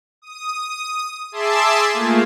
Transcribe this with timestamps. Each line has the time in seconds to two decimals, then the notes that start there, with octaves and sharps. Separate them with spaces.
0.22 D#6
1.32 G#4 E5 A5 C6 D6 E6
1.93 A3 A#3 F4 G#4